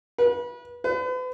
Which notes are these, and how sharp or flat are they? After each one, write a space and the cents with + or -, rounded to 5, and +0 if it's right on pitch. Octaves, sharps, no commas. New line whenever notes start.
B4 -30
B4 +40